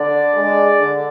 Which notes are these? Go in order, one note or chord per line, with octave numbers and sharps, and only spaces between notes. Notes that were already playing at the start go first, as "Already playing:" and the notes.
Already playing: D3 D4 D5
G#3
D4
D3